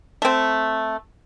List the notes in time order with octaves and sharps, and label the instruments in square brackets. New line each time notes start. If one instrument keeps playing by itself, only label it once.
[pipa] A3 C4